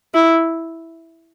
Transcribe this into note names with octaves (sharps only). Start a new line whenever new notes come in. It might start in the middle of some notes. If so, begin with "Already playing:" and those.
E4